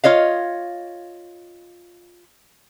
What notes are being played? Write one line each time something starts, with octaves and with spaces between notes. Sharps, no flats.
F4 C#5 D#5 F5